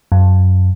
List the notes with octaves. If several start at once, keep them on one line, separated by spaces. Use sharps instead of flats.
F#2